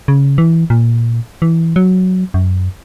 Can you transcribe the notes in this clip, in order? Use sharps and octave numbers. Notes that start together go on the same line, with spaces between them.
C#3
E3
A#2
E3
F#3
F#2